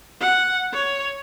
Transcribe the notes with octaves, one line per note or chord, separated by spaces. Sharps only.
F#5
C#5